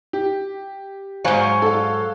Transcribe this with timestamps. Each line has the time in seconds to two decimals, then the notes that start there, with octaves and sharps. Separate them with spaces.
0.13 G4
1.25 G#2 F#3 C5 F5 G#5
1.62 A4 F5